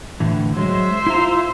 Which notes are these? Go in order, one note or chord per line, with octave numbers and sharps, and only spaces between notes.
A2 D3 E3
F#3 G#3 C5 E5
E4 F4 A#5